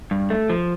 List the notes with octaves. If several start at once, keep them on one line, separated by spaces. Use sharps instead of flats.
G2
A3
F3